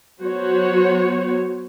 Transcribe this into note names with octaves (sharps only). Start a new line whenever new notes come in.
F#3 B3 F#4 C5 C#5